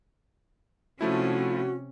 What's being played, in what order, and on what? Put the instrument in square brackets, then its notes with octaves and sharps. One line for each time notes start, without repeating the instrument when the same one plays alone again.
[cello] C3 C#4 [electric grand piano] F3 A3 E4 [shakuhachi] F#4